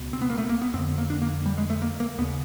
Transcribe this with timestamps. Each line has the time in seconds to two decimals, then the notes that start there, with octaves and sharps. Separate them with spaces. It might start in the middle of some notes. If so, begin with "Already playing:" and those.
Already playing: C#2 B2
0.13 C4
0.22 B3
0.30 A#3
0.38 A3
0.49 A#3
0.62 B3
0.73 F2 C4
0.78 D3
0.98 A#3
1.10 D4
1.22 A#3
1.46 G3
1.58 G#3
1.70 A3
1.82 A#3
2.00 A#3
2.18 D#2 B3
2.21 C#3